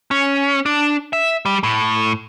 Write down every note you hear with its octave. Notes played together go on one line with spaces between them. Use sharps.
C#4
D4
E5
G3
A2